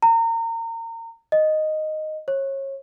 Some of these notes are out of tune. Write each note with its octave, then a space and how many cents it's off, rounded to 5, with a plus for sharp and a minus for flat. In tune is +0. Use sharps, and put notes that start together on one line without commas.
A#5 -30
D#5 -5
C#5 -30